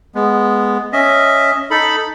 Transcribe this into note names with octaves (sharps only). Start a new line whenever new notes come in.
G#3 B3
C#4 D#5 E5
D#4 A4 B5